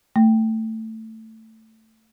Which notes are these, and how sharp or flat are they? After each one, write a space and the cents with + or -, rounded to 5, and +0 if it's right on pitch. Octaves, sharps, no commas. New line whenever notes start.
A3 +15